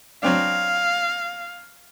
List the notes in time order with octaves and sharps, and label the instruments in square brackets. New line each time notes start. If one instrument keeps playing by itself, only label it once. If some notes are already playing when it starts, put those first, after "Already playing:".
[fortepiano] F#3 C4 D4 [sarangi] F5